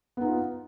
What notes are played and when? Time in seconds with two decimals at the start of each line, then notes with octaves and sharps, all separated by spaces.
0.17 B3
0.21 D#4
0.25 F4